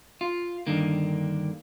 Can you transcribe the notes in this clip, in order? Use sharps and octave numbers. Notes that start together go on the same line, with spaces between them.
F4
G2 D3 D#3 A#3